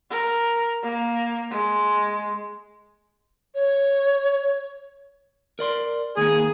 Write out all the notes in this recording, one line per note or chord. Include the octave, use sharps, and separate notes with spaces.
A#4
A#3
G#3
C#5
A#4 D5 C6
D#2 A#3 G#4